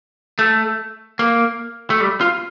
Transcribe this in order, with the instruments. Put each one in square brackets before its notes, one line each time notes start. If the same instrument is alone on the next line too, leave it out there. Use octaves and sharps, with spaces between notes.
[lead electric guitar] A3
A#3
A3
G3
F4